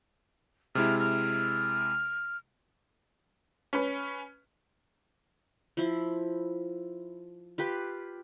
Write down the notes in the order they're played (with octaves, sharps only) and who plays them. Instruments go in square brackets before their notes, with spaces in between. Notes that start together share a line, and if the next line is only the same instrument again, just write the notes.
[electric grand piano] C3 G#3 E4 [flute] F6
[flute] F6
[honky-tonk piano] C#4 B4
[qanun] F3 E4
F4 G4 B4